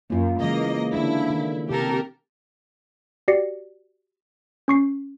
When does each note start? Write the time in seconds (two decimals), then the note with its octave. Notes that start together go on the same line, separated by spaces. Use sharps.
0.10 F#2 A#3 F4
0.40 C#3 E3 G#3 A#3 D#5
0.93 D3 A#3 D4 E4
1.30 D#3
1.70 C3 G4 A4 A#4
3.28 F#4 G4 D5 A#6 C7 C#7
4.68 C#4 C#6 C7